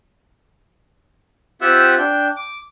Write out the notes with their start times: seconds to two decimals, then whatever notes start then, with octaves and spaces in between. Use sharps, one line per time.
1.61 C4 F4 G4 E5 F#5 E6
1.99 D4 G5
2.37 D6